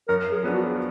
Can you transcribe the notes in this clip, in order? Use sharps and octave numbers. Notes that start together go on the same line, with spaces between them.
F#2 A#4
G#4
F3 B3 D4 G#4
F#4